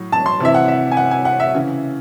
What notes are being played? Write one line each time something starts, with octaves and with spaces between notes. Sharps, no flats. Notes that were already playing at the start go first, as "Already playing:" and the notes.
Already playing: A2 F#3
A5
C6
C3 E3 E5
F#5
E5
G#5
F#5
G#5
F#5
E5
C#3 E3